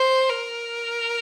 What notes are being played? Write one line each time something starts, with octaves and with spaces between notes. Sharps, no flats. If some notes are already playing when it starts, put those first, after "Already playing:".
Already playing: C5
A#4